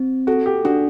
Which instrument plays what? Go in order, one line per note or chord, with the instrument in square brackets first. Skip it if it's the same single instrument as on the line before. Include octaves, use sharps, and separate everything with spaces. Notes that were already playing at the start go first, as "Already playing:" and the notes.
Already playing: [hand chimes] C4
[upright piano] F#4 [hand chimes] A4
[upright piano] G4
[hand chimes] D4 [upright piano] F#4